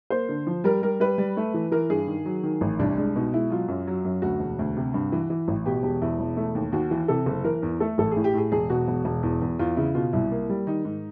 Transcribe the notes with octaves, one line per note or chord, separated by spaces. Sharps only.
A#3 C5
D3
F3
G3 A#4
G3 A#4
G3 B4
G3
A3
E3
E3 A#4
G2 G#4
D#3
F#3
D#3
A1
C2 D4
G#3 D4
B2 D#4
G#3 E4
F#3 F4
F#2
F#3
F#2
D2 F#4
E1
D2
C3
G2
E3
E3
A1
B2 G4
E1 G4
E2 E4
E1
A3
D#2
D#2 F#4
E3
C3 A4
F#1
E3 A#4
E2
A3 A4
A1 A4
G#4
A2
G4
A2 G#4
E1 G#4
B2 F#4
E1
E1
E2
E2
E2 F4
C#3 E4
B2 F4
C2 E4
A#3
G3
D#3 D#4
G#2